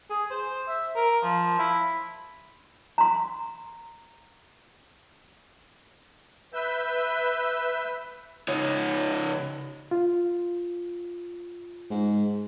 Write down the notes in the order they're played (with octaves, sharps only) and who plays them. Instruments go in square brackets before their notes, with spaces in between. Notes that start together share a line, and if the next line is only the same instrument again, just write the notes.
[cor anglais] G#4
C5
E5
A#4
F3
E4
[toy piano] A#5 C6
[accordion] B4 E5 E6 G6
[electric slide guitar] C#3 D#4 C#5
[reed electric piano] F4
[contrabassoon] G#2